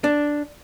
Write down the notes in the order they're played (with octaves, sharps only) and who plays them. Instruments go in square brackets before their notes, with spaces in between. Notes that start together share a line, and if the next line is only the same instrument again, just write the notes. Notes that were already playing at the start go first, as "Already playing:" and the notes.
[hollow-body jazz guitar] D4